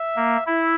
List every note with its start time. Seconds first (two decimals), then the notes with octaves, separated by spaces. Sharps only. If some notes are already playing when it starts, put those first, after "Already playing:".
Already playing: E5
0.16 A#3
0.46 E4 E5